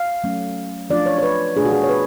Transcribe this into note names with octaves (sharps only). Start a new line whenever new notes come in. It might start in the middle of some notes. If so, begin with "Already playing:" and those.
Already playing: F5
F#3 A3 C#4
F3 A3 D4 F4 D5
C#5
C#5
B4
B2 A3 D4 F4 G#4
F#4
G#4
C#5
B4